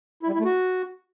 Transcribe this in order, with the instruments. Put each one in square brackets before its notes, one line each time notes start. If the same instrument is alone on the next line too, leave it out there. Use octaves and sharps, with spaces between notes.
[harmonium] E4
G3
E4
A3
F#4